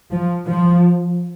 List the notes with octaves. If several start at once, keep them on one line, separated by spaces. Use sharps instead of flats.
F3
F3